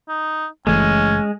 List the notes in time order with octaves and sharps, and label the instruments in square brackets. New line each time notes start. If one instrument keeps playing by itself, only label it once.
[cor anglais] D#4
[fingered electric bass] F#1 E3 A3 [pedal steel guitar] G#3 [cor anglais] C#4